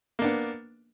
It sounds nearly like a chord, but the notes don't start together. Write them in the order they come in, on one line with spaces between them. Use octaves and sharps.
A#3 D4 B3